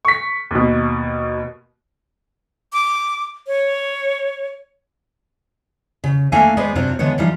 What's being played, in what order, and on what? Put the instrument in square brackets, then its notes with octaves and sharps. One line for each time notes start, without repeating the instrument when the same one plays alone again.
[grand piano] C#6 B6
D#2 B2
[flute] D6
C#5
[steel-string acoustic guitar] C#3
A3 A#3 D4 A4 F5 G#5
G#3 B3 G#4 B4 C5 D5
F#2 C3 F#3 C4 D4 F4
D3 E3 G#3 B3 C#5
E3 F3 G3 D#4 F4